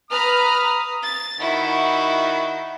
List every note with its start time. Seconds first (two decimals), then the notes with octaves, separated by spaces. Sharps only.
0.11 B4 A#5 D#6 F6
1.03 A6
1.40 D#3 E4 F#4